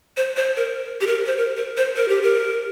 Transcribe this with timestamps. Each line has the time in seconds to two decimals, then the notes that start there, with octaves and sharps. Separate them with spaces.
0.17 C5
0.36 C5
0.57 A#4
1.01 G4
1.07 A#4
1.26 C5
1.37 A#4
1.57 A#4
1.77 C5
1.96 A#4
2.09 G4
2.22 A#4